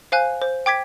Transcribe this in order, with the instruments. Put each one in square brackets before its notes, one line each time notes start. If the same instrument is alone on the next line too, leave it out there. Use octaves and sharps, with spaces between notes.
[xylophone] C5 F5 G#5 F#6
C5
G5 D6 G#6 B6